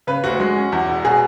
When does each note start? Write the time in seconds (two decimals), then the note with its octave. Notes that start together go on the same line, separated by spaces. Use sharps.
0.07 C#3 B4
0.24 D2 F#4
0.40 G#3
0.56 C#4
0.72 E2
0.88 E1
1.05 B2 G#4